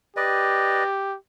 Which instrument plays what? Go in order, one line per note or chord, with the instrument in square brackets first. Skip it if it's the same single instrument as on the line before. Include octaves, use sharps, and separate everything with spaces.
[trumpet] G4 [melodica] B4 D5 D#5